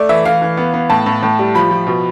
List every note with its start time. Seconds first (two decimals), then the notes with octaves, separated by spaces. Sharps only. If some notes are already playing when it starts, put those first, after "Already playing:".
Already playing: A3 D5
0.09 E3 E5
0.25 E3 F5
0.42 E3
0.57 B3
0.74 B3
0.90 A2 A5
1.06 A2
1.23 A2
1.39 G3
1.55 F3 B5
1.71 F3
1.87 B2